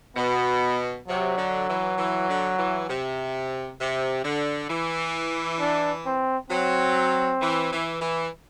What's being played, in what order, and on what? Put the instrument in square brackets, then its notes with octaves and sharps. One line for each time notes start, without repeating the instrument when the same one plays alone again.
[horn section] B2 [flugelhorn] B3
[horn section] C3 [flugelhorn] F#3
[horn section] D3
E3
E3
D3
E3
C3
C3
D3
E3
[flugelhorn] D4
C4
[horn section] F#3 [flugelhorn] C4
[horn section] E3
E3
E3